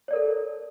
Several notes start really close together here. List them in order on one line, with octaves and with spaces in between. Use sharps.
C#5 D5 A#4 A4